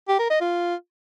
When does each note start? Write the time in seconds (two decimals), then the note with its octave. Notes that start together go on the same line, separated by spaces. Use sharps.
0.08 G4
0.19 A#4
0.30 D#5
0.41 F4